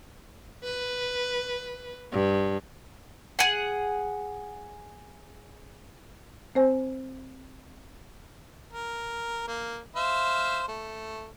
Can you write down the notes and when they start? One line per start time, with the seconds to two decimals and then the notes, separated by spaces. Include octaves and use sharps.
0.64 B4
2.12 G2
3.39 G#4 F#5
6.55 C4 C5 G#5
8.73 A#4
9.48 A#3
9.96 C5 E5 F5
10.68 A3